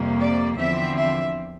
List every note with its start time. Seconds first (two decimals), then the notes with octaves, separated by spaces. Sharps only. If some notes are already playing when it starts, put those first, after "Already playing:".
Already playing: F2 C3 G3 A#3
0.20 D5
0.58 E2 D3 F3 C4 E5
0.97 E5